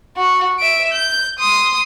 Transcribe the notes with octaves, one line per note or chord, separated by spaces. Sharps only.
F#4
E5 D7
G6
C6 D#6